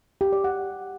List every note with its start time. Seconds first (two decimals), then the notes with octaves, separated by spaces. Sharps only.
0.21 G4
0.33 D5
0.44 F#5